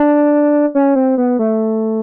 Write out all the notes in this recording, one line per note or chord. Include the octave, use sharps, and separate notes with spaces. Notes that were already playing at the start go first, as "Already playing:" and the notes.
Already playing: D4
C#4
C4
B3
A3